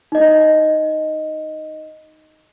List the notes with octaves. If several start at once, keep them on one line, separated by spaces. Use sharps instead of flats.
D#4 D#5